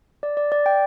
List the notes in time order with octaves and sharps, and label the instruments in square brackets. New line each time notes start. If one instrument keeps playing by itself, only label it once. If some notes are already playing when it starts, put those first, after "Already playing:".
[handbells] D5
D5
D5
G5